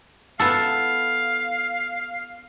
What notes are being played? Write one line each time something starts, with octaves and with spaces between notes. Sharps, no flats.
B3 E4 A4 F5